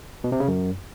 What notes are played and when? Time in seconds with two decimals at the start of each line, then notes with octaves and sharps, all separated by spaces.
0.24 B2
0.32 C3
0.40 C#3
0.48 F#2